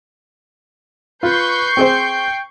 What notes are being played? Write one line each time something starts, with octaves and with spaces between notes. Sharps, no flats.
F4 B4 C#6 G6 C7
C4 G#4 C5 G5